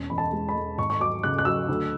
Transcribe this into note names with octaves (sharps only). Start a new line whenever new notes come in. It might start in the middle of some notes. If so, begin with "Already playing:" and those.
Already playing: E1 C#4
E2 B5
A5
G#3
B5
G#3
G#1 C#6
C#6
F#3 D6
C#3 F#6
F#6
F#3 E6
D2